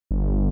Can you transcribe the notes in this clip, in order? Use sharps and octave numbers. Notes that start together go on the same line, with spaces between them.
G1